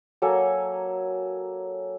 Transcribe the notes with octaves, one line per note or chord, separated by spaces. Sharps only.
F#3 A#3 A4 G#5